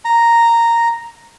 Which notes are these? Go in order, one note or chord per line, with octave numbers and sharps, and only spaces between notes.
A#5